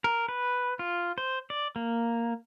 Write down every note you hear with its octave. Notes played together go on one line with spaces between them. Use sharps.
A#4
B4
F4
C5
D5
A#3